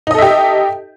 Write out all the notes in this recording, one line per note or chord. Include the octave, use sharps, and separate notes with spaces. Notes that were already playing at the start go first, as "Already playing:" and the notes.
D#4 G4 A4 D#5 E5